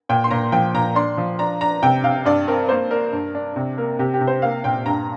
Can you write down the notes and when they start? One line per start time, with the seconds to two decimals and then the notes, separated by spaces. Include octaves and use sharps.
0.09 A#2 G5
0.24 C6
0.31 A#2 A#5
0.52 F3 G5
0.74 A#2 A#5
0.95 D4 C6
1.18 F3
1.39 D4 A#5
1.61 D4 A#5
1.83 C3 G5
2.04 C3 F5
2.25 G2 D5
2.48 C4 A#4
2.69 A#3 C5
2.91 D4 A#4
3.13 G2
3.35 D4
3.56 C3
3.77 A#3 A#4
3.99 C3 G4
4.14 G4
4.21 C3
4.27 C5
4.42 A#3 F5
4.64 A#2 G5
4.86 G2 A#5